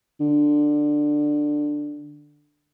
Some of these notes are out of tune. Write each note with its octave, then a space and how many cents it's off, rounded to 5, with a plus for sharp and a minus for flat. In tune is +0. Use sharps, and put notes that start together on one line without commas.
D3 +10